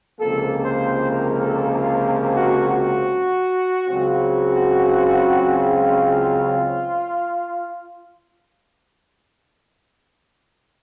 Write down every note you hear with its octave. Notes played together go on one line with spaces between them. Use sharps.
C#2 C3 F3 A#3 A4
C5
A#4
A4
F4
F#4
F#4
C#2 C#3 F#3 C4 F#4
F4